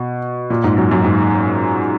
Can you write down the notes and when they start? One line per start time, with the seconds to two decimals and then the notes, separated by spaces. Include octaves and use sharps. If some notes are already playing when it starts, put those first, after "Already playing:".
Already playing: B2
0.50 A#2
0.64 G#2
0.77 F#2
0.91 F#2
1.04 G#2